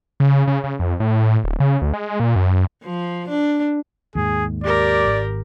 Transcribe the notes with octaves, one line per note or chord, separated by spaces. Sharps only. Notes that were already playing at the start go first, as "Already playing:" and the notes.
C#3
C#3
C#3
F2
A2
D1
C#3
D2
G#3
A#2
F#2
F3
D4
D#2 G#2 G#4
G4 A#4 D5
G#1